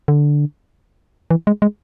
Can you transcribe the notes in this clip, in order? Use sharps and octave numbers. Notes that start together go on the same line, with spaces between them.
D3
E3
G#3
G#3